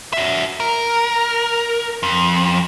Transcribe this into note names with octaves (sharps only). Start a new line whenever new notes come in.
F#4 E5
A#4
F2